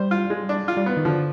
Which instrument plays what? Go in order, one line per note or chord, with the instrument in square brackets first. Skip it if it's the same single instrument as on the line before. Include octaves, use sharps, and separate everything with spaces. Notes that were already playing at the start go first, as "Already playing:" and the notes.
Already playing: [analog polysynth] G3 [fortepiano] C5
[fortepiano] F4
G#3
D4
F4
[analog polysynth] G3
[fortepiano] B3
[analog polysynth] D#3
[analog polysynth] D3 [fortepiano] F3